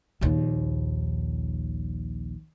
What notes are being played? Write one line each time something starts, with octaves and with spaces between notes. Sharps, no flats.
A#1 D#2